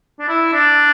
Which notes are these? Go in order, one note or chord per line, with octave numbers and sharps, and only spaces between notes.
D4
E4
D4